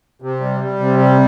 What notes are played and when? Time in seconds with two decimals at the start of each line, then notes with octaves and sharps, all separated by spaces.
0.22 C3
0.40 G3
0.61 G3
0.80 C3
0.99 G3